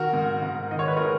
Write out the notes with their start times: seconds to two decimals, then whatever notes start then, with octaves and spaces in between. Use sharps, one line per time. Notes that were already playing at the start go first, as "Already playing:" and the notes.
Already playing: D#3 F#4 A#4
0.13 G#2
0.42 G#2
0.71 D#3 D#5
0.79 C#5
0.88 B4
0.96 G#3 A#4 C#5